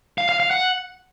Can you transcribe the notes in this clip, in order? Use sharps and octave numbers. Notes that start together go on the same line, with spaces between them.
F5
F5
F5
F#5